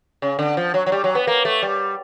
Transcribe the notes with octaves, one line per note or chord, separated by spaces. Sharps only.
C#3
D3
F3
F#3
F#3
G3
F#3
B3
A#3
A3
G3